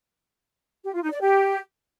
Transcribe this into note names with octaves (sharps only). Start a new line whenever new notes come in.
G4
F4
D#4
D5
G4